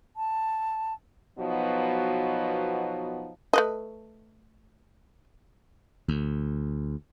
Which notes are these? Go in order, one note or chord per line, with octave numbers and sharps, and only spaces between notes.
A5
B2 F3 F#3 B3 D#4 F#4
A3 B4 D#5
D2